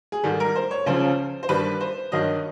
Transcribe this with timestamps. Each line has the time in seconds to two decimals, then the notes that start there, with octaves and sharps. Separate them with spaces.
0.12 G#4
0.24 G#2 D#3 G3 A4
0.40 A#4
0.55 C5
0.71 C#5
0.86 C#2 C#3 F3 C5
1.43 C5
1.49 G2 D#3 G3 B4
1.80 C5
2.12 G2 D#3 F#3 D#5